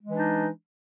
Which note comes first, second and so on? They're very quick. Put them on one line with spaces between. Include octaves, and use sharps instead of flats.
G#3 E3 D4 D#4